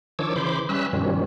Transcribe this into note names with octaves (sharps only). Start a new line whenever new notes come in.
D#3 F3 D4 C#5 D6 E6
C#3 E3 C5 B5 C6 D6
G3 C#4 B4 E5 E6 F#6
G2 B2 D#3 F3 G3 C#4